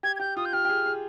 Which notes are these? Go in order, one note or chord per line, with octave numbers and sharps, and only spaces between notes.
G4 G#6
G#6
G4 G6
F4 D#6
G6
G4 F6
G4
G#4
G#4